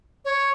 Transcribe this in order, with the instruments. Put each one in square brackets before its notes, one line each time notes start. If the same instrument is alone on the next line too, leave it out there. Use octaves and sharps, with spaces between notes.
[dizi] C#5